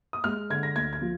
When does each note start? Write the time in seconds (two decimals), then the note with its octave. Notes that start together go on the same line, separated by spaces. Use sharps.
0.13 D#6
0.24 G#3 F6
0.50 D3 G#6
0.63 A#6
0.76 D2 G#6
0.93 G#6
1.02 F3